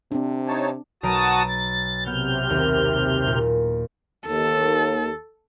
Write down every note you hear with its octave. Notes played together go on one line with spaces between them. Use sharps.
C3 C4 D4
D#4 C#5 A5
B1 F#4 A5 A#5 D#6 D7
A6
C3 B3 F6 G6
D#2
A#2
D#2 A4